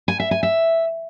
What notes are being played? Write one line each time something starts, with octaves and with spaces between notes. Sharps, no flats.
G#5
E5
G#5
E5